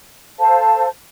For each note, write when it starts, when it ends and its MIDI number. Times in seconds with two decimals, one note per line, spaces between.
0.39 0.86 69
0.39 0.86 72
0.39 0.86 77
0.39 0.86 81